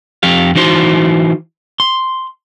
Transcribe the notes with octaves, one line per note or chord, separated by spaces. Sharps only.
F2 G4 F5
E3 D#4 F#4 C5 C6
C6